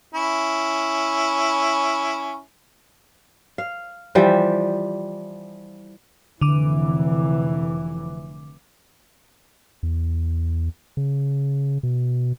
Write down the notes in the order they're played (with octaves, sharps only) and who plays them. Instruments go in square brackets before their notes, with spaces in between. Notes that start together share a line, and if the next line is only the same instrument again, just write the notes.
[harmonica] C#4 E4
[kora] F5
E3 F3 G3 E5
[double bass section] F1 E3 [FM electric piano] D3 D6
[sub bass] E2
C#3
B2